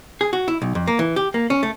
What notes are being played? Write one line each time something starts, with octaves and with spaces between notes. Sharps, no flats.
G#4
F#4
E4
B1
F2
A#3
E3
G4
A#3
C#4
A3